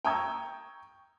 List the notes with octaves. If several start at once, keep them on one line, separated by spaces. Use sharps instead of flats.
G5 A#5 C#6 D#6 E6 G#6